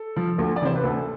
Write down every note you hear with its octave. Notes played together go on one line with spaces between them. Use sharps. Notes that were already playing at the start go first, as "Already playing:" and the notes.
Already playing: A4
F3
D2
D5
C3 E3 C5
B4
D2 A4